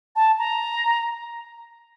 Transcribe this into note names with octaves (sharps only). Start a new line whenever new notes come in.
A5
A#5